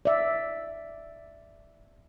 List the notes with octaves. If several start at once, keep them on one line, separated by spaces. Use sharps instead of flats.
D5 E5